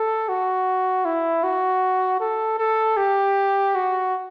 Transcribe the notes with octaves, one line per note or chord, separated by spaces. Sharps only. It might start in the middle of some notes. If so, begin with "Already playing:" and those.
Already playing: A4
F#4
E4
F#4
A4
A4
G4
F#4